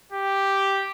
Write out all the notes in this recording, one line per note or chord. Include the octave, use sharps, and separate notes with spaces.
G4